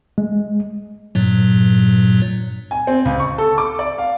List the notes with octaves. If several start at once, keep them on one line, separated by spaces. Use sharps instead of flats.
G#3
G2 A#2 F#3
G#5
C4
C#2
C#6
A4
D6
D5
F5